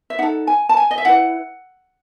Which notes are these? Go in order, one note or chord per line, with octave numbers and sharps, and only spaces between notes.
E5
D#4 A4 F#5
G#5
A5
G#5
D#5
E5
E4 B4 F#5